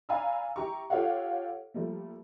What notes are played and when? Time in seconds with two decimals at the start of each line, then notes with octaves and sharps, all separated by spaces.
0.09 D5 F5 G#5 A#5 B5 E6
0.56 E4 G4 A#5 C#6
0.90 F4 G4 A4 C#5 F5 F#5
1.74 F3 G3 A3 A#3